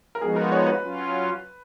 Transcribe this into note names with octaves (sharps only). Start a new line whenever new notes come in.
A#4
F3 G#3 B3 D#4 F#4 G#4
A#4
C#5
B4
F#3 C#4 F4